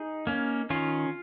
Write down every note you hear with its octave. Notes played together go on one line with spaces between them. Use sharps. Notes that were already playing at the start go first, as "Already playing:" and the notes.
Already playing: D#4 G#4
A#3 C#4
D#3 C#4 F4